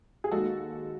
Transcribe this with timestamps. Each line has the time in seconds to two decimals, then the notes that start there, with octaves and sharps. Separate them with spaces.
0.24 G#4
0.31 D#2 D#3 G#3 F#4 A4